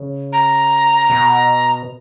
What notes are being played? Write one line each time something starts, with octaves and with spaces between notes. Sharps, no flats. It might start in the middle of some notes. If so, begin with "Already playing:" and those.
Already playing: C#3
A#5
B2